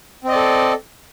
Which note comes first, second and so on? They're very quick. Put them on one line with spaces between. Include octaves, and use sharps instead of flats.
C4 D#5 D5 A4